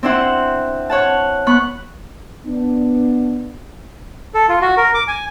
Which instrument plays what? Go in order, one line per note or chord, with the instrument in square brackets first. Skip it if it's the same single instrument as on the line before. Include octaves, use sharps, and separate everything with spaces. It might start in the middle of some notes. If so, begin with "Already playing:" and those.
[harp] C4 D4 E4 C5 F#5
C#5 F#5 A5
B3 B5 C#6 F#6
[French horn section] B3 D4
[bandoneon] A4
F4
F#4
A#4
D6
G#5